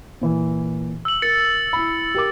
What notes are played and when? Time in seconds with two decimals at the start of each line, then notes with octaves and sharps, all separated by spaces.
0.21 A#2 E3
1.05 E6 F#7
1.22 A#4 A6 C#7
1.73 E4 B5
2.15 G4 A#4 D6